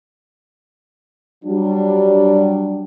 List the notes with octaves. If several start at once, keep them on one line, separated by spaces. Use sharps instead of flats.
F#3 G3 D4